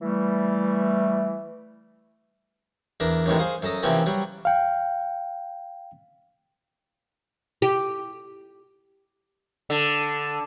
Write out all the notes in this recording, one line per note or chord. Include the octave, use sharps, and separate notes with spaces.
E3 G3 A3
E2 D4 A#4 A5
A1 F#2 A2 D#3 G#3
G#4 C5 F5 C#6 D#6
F#2 A4 A5 A#5 D#6
C3 E3 F3 A#3 C4 C#4
F#3 G3
F5 G5
G4
D3